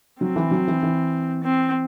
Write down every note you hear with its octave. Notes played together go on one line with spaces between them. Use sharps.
F#3 C4
E3
F#3
E3
E3
C4